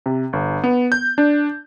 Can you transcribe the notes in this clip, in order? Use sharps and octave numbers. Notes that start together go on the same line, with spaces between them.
C3
G1
B3
G6
D4